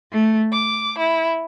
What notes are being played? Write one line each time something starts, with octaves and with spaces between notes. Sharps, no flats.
A3
D6
E4